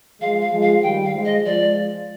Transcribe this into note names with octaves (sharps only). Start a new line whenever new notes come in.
F3 G#3 F5
F5
F3 G#3
F5
D#3 G3 G5
F5
F3 G#3
D#5
F3 G#3 D5